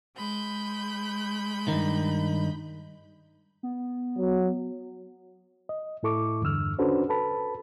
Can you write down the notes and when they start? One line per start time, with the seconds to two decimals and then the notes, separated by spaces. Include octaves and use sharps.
0.16 G#3 B5 G6
1.68 G2 D#3
3.63 B3
4.18 F#3
5.69 D#5
6.03 A2 E4 A4 C#6 D6
6.42 E2 G2 D3 E6 F6
6.79 C#4 D4 F#4 A4 B4 C5
7.09 A4 B4 A5 B5